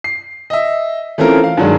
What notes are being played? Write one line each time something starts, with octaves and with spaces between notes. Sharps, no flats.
C7
D#5 E5
E3 A3 C4 C#4 F4 A#4
F5
G2 D#3 F#3 G#3 D4